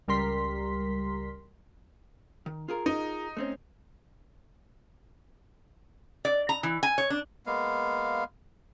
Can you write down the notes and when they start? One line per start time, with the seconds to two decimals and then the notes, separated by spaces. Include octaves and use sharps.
0.08 C#2 G3 A#4 C6 B6
2.46 D#3
2.69 F4 G#4 A#4
2.86 D#4
3.37 A3 C4 C#4
6.25 D5
6.49 A#5
6.63 E3
6.83 G#5
6.98 C#5
7.10 D4
7.46 G#3 A#3 B3 F5